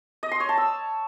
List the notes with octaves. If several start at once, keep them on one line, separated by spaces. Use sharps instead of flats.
D#5
C6
C#5
A5
E6